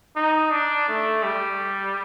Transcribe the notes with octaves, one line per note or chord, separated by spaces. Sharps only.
D#4
D4
A3
G3